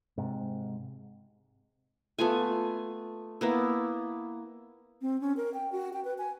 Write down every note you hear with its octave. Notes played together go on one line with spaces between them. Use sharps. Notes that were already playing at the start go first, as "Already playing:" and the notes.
G#2 C3
A3 B3 F4 G#5
A#3 B3 E4
C4
C#4
A#4
G5
F#4
G5
B4
G#5